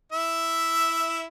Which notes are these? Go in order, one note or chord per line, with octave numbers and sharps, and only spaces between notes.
E4 E5